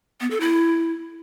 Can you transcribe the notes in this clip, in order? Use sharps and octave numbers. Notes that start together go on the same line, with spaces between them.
B3
A4
E4